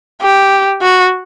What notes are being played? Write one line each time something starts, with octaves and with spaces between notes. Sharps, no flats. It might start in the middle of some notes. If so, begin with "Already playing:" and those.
G4
F#4